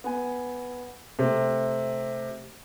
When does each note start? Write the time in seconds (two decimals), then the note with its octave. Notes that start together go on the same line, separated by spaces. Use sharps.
0.04 B3 G#5
1.19 C3 A3